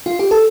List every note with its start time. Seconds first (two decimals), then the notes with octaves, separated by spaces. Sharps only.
0.06 F4
0.19 G4
0.31 A4